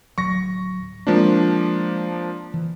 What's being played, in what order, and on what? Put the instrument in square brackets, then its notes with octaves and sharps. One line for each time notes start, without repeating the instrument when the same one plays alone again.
[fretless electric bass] D1 F#3 [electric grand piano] C#6 A#6
[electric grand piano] F3 A#3 D4 [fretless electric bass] G#3 C4
[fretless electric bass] E3